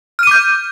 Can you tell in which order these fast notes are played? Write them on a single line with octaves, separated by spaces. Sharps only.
F6 D#7 D6 G6